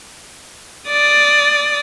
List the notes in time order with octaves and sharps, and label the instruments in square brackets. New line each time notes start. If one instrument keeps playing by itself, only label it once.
[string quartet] D5 D#6 A6